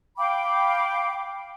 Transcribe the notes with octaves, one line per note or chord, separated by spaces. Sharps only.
F5 G5 B5 D6